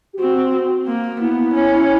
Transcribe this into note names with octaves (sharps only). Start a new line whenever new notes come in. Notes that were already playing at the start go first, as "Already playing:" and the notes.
G4
C4 F#4
A#3
B3 E4
C#4